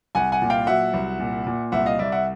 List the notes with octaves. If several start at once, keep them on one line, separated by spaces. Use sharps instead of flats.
C2 F#5 G#5
F#5 G#5
A#2
F5 G5
F#3 E5 F#5
C2
A#2
A#2
C2 E5 F#5
D#5 F5
C2 D5 E5
E5 F#5